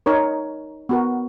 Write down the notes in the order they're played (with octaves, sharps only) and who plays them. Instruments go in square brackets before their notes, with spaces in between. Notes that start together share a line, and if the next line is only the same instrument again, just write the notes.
[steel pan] D#4 A#4 C#5
B3 F#4 A#4